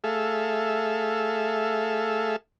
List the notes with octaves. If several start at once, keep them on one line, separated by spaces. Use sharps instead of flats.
A3 G#4 A4 E5 F5